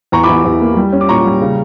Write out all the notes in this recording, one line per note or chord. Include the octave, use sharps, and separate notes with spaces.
E2 A#5 C#6
B5 D6
E2
E2
A#3
G3
C#4
D6
A#2 A#5 C#6
G3
C#3